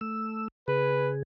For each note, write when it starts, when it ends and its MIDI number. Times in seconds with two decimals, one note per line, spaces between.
0.01 0.48 57
0.01 0.48 88
0.68 1.23 49
0.68 1.23 68
0.68 1.11 71